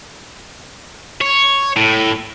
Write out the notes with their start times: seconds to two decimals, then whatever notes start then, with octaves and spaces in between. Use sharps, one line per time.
1.21 C#5
1.77 A2